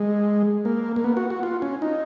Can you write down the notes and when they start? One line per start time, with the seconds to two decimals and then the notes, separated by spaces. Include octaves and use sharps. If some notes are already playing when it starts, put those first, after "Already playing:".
Already playing: G#3
0.65 A#3
0.96 A#3
1.04 B3
1.17 F#4
1.30 F#4
1.43 F4
1.62 C#4
1.82 D#4